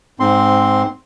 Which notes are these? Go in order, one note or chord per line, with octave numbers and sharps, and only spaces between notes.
G#2 C4 C6